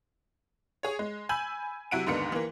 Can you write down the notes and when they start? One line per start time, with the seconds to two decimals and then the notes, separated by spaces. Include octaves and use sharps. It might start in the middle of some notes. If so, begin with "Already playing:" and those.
0.83 G#4 C#5
0.99 G#3
1.29 G#5 B5 E6 G6 F#7
1.91 C3 F#3 E4 F#5 D7 D#7
2.07 D#2 G#2 D3 D#3 B3 C#7
2.32 E3 A#3